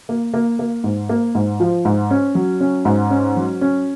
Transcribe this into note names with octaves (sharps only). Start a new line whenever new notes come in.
A#3
A#3
A#3
G#2
A#3
G#2
F3
G#2
C#4
F#3
C#4
G#2
C#4
F#3
C#4